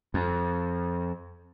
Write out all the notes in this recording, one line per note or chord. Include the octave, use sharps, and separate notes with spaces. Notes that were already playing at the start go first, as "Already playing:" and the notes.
F2